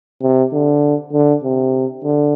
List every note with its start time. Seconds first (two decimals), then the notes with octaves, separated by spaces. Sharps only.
0.22 C3
0.52 D3
1.13 D3
1.43 C3
2.04 D3